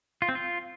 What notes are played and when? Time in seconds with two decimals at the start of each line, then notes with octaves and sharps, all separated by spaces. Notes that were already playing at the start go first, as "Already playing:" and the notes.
0.22 F4
0.29 C4
0.35 F4